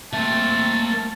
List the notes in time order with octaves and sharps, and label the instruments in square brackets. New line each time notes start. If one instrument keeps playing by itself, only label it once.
[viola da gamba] A3 C4 [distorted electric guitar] A#3 E5 [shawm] A5